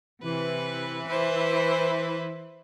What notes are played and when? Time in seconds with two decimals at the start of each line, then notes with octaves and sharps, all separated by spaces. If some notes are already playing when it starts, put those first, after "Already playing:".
0.22 C3 E3 B4
1.07 E4 B4 C5